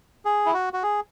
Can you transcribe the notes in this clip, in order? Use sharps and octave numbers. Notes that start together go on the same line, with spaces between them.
G#4
E4
F#4
F#4
G#4